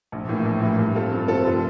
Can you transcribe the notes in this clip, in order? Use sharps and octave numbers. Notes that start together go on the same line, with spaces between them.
A#1
A2 E3 A#3
A#1
A2 E3 A#3
G2
F3 C4 F4 A4
G2
F3 C4 F4 A4
F1